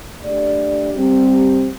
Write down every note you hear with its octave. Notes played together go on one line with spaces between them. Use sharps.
A3 D4 G4 D5
G3 C4 G4